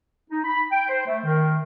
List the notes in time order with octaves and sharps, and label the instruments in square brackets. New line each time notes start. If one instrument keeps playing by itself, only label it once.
[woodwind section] D#4
B5
G5
C5
A3
D#3